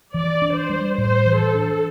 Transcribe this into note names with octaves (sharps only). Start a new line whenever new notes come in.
E3 D5
D4
C5
G3
A2 C5
E3
A4
D4